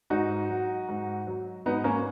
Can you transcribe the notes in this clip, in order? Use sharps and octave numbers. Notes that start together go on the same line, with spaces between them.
G#2 D#4 F#4
F#3
G#2
F#3
G#2 B3 D#4
A#3 C#4